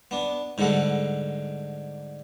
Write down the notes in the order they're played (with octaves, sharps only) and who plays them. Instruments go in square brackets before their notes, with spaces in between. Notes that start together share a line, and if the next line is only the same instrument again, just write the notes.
[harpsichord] B3 D4
G#2 D3 G3 A4 F#5